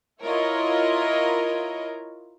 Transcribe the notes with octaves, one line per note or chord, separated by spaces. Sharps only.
E4 F4 A#4 C#5 D#5